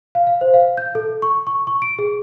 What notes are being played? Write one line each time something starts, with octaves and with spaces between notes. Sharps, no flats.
F5
F5
C5
F5
G6
A4
C#6
C#6
C#6
D7
G#4